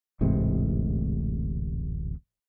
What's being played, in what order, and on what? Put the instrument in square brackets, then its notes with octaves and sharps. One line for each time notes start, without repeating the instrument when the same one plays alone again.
[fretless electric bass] D1 A1 G#2 C3